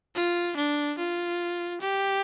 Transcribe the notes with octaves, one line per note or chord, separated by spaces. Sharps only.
F4
D4
F4
G4